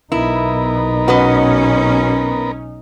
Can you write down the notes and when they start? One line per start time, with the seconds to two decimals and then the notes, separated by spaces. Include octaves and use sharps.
0.12 B1 B3 D#4 E4 A#4
1.08 C#4 F#4 B4 D#5